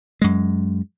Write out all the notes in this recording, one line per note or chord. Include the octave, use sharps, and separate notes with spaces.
F#2 G#3